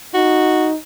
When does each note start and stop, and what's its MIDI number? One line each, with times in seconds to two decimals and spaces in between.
0.14 0.76 63
0.14 0.68 66